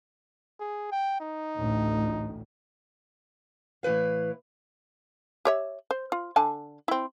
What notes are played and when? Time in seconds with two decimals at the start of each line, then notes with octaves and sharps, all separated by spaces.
0.60 G#4
0.92 G5
1.20 D#4
1.57 A1 D2 A2
3.83 A2 E3 E4 B4 F5
5.45 G4 C#5 E5
5.91 C5
6.12 F4
6.36 D3 G#5 A5
6.88 C4 E4